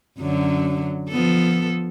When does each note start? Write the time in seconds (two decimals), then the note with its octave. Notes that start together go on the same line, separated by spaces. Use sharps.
0.19 F#2 D3 F#3
1.10 F3 B3 A4